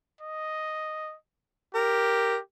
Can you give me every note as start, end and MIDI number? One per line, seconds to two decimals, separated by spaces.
0.20 1.15 75
1.75 2.40 67
1.75 2.36 70